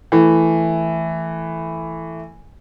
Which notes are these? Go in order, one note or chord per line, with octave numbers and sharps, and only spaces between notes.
E3 A3